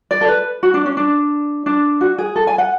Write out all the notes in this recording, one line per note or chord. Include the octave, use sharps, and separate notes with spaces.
D5
A4
B4
F#4
D4
C#4
D4
D4
F#4
G#4
A4
G#5
F#5